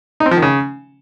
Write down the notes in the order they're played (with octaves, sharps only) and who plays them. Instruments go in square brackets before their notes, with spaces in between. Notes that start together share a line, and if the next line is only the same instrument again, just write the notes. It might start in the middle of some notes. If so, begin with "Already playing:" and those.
[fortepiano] D#4
C4
F3
D#3
C#3